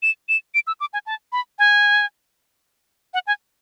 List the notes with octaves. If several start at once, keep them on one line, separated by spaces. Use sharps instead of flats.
E7
E7
D7
E6
D6
G#5
A5
B5
G#5
F#5
G#5